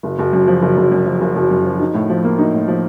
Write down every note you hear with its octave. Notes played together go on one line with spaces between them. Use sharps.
F#1
F#1
F#2
F3
F#1
F#1
F#2
F3
F#1
F#1
F#2
F3
D#4
A2
F3
A#3
D#4
A2
F3